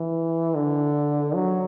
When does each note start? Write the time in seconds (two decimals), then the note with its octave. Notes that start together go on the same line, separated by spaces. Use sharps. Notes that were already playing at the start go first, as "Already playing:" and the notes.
Already playing: E3
0.55 D3
1.35 F#3